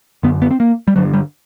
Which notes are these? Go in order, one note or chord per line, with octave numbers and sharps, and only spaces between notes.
F#2 D3 B3
B3
C4
A#3
G3
G2 D3 F#3
G3